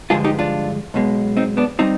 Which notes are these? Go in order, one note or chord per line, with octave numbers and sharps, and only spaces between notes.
G2 D3 F3 G#3 F4 G#4
D#4 G4
D4 F4
B1 B2 G#3
C4 D#4
B3 D4
G3 C4 D#4